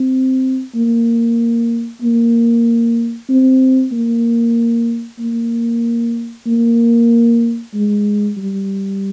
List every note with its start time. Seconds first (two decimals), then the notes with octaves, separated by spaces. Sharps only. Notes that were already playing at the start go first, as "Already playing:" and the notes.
Already playing: C4
0.75 A#3
2.02 A#3
3.29 C4
3.92 A#3
5.19 A#3
6.46 A#3
7.74 G#3
8.37 G3